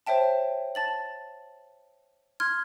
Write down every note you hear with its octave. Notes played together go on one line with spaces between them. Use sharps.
C5 C#5 E5 G5 A5
A5 A6 F#7
C6 F6 G#6